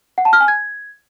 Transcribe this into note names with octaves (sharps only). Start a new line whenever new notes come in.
F#5
A5
F6
G#5
G#6